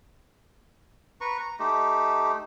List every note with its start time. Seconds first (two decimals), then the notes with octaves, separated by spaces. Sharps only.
1.21 B4 A#5 C#6
1.40 A#5
1.60 A3 D#4 G4